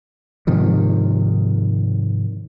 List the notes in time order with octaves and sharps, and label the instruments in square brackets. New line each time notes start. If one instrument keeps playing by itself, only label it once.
[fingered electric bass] G#2 C3 D#3 F3